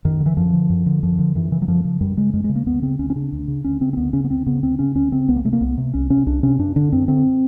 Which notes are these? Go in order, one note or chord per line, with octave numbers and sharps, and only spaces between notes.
F#2 D#3
D3
E3
F#2 F3
D3
F#2
D3
F#2 F3
D3
F#2 E3
C#3 E3
F#3
F#2 F3
C#3 F3
F#2 G3
C#3 G#3
F#2 G#3
G#3
C#3
A#3
D2 B3
C#3 C4
D2 C#4
C#4
C#3 D4
D2
C#3
D2 C#4
C#3 C4
C4
D2 B3
C#3 C#4
B3
D2 C4
C#3 B3
D2 C4
C#3 C#4
D2 C#4
C#3 C4
C2 B3
A#3
C3 A3
A#3
C2 B3
C3
C2 C#4
C3 C#4
C2 D4
C3 C#4
F#2 D4
D3 D4
F#2 C4
D3 C4